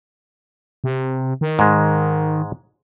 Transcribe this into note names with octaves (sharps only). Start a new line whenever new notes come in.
C3
D#3
G#2 G#3